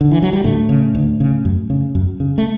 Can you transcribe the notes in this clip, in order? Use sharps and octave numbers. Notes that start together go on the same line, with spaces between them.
D3
E3
F#3
G3
D2 A2 A3
C#3
D2
C#3
F#2
C#3
F#2
C#3
A3